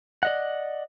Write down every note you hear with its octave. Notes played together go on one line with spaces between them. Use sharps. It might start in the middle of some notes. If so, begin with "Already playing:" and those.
D5 D#5 F#5